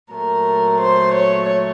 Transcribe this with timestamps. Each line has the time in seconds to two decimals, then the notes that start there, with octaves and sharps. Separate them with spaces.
0.12 A#2 F#3 A3 A#4
0.80 C5
1.14 C#5